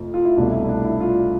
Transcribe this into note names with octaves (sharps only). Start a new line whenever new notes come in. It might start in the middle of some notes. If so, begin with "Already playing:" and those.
Already playing: F2 C3 F3 A3
F4
E4
C2 B2 A3 D4
E4
D4
E4
F4